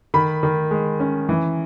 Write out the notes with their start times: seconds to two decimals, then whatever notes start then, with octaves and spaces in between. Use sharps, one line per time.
0.14 D#3 B5
0.43 D#3
0.71 G#3
1.00 C#4
1.29 E3